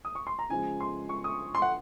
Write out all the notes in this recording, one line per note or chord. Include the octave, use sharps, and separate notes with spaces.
D#6
C#6
C6
A#5
C#3 F3 G#3 G#5
C6
C#6
D#6
C6
F#5